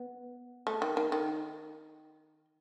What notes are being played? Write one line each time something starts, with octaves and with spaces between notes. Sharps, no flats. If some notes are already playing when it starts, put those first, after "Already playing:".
Already playing: B3
A3
D#3
D#3
D#3